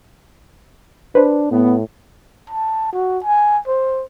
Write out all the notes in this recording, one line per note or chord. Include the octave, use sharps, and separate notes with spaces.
D4 B4 C5
A2 B3
A5
F#4
G#5
C5